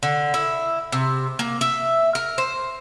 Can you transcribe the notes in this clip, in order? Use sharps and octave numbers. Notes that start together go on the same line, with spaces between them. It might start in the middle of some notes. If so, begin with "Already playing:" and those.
D3
E4
C3
A#3
E5
A#4
C5